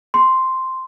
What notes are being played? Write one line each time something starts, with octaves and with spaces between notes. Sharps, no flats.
C6